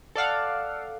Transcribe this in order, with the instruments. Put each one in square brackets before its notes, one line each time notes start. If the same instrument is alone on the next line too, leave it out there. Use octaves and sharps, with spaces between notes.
[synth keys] A4 D5 F5 F#5